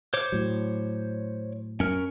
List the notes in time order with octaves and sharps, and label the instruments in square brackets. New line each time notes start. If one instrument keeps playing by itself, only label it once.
[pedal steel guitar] C5 C#5 D6
[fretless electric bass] A2 F#3
[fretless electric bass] F#2 [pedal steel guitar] C#4 A#4